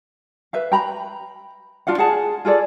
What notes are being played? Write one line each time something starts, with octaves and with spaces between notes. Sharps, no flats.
B4 E5 F5
G5 A#5 B5
D4 F4 F5 F#5
G#4 F#5 A5
F4 G#4 A4 D5